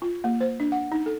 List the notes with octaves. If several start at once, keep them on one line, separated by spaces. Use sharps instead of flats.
F4
A#3
C5
D4
F#5
D#4
A4